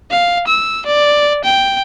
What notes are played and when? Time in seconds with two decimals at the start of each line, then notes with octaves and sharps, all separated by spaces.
0.11 F5
0.48 E6
0.86 D5
1.44 G5